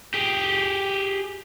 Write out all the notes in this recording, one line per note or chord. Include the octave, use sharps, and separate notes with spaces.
G4 G#4